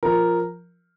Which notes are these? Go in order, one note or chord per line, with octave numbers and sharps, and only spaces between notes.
F3 A#4